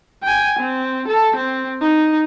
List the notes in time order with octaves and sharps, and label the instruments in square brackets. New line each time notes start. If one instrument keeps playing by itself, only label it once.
[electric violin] G5 G#5
C4
A4
C4
D#4